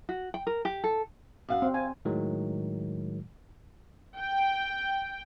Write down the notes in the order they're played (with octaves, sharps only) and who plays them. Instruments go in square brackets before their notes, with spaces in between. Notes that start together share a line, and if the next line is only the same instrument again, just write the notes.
[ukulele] F#4
G5
A#4
G4
A4
[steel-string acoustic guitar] F#2 F5 F#5
[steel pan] C4
[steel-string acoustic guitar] F5 [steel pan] G#5
[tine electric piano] A2 D#3 F#3 G#3
[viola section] G5